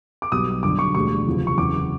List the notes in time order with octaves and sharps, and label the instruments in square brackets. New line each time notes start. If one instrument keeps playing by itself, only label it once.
[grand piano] D6
B1 B2 G3 D#6
G1 F#2 D3 D6
C#6
E1 D2 D3 G3 C#6
F#1 E2 C3 F3
C#6
F#1 E2 C#3 D6